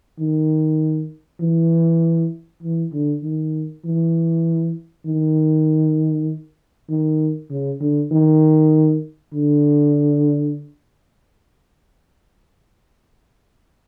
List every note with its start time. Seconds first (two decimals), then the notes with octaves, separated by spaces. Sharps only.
0.19 D#3
1.40 E3
2.63 E3
2.92 D3
3.23 D#3
3.85 E3
5.06 D#3
6.89 D#3
7.50 C#3
7.81 D3
8.11 D#3
9.34 D3